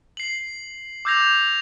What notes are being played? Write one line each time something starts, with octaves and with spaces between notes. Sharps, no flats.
C7 F#7
D6 E6 G6 G#6 A#6 F7